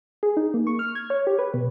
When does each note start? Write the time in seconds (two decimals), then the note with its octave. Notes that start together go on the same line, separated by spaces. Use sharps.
0.23 G#4
0.37 D#4
0.54 A#3
0.67 C#6
0.79 F6
0.95 G#6
1.10 C#5
1.27 G4
1.39 B4
1.54 B2